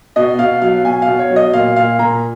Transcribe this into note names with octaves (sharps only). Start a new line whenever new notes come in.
B2 D#5
B2 F5
F#3 F5
B2 G#5
F5
B2
C#5
F#3
D#5
A#2 F5
A#2 F5
A#2 A#5